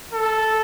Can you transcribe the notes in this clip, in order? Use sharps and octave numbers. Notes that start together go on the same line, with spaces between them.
A4